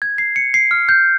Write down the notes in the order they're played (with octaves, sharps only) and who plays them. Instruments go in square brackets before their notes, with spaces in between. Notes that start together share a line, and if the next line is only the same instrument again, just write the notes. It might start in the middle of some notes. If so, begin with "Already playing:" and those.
[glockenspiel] G#6
C7
C#7
C7
F6
G6